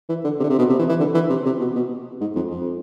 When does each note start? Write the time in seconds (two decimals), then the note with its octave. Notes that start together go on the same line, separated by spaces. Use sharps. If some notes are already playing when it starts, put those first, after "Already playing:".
0.09 E3
0.24 D3
0.39 C3
0.44 D3
0.50 C3
0.59 B2
0.69 C3
0.79 E3
0.89 E3
1.00 D3
1.14 E3
1.30 C3
1.45 C3
1.60 B2
1.76 B2
2.21 G#2
2.36 F2
2.51 F2